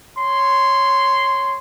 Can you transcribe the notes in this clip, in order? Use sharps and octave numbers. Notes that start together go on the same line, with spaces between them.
C#5 C6